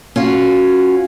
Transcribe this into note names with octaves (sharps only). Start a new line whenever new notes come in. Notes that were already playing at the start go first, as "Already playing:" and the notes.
C#4 F4 F#4